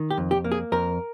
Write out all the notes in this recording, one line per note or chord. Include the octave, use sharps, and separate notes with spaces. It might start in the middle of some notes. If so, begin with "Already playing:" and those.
Already playing: D#3
G4
F2
G4
A#3
G#4
F2 A#4